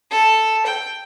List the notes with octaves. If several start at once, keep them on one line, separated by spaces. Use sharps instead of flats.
A4
G5